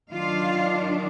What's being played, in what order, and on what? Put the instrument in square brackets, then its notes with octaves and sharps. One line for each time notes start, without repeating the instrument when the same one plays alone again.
[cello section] D#3 F#3 D4 F4 F5